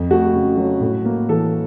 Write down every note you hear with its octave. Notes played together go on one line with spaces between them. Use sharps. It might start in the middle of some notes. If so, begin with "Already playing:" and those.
Already playing: F2
A3 F#4
C#3
F#3
A2
A#3
E3 A4